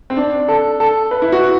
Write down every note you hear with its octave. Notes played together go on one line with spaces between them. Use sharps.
C4
D4
A4
A4
B4
E4
F#4